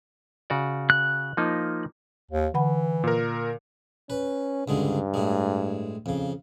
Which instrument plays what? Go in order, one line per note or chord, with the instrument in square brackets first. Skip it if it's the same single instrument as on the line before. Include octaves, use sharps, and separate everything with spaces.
[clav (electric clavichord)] C#3 F#4 D5
[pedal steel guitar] F#6
[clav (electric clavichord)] F3 A#3 D#4
[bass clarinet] D#2
[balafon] D3 F#5 B5 [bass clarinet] E3
[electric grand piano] A#2 A#4
[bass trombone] C#4 [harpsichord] B4
[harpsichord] C#2 D3 G#3 [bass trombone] G2
[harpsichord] A2 G#3
F2 C#3